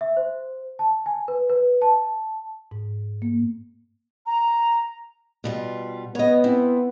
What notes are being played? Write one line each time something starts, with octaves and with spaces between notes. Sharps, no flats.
E5
C5
A5
G#5
B4
B4
A5
G#2
A#3
A#5
B2 G3 F4
B3 C#5 D#5
C4 E4